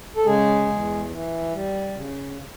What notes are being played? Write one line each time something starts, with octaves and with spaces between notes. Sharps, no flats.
A4
C#3 G#3 G#4
E2
E3
G3
C#3